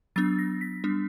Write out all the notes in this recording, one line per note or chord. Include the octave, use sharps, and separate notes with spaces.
F#3 B3 D4 A6
A#6
B6
G3 B3 D4